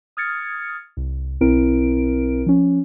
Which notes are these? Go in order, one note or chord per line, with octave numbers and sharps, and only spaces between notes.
D#6 F6 G#6 A6 C#7
C2
B1 C4 E4 A#4 D7
F3 C#4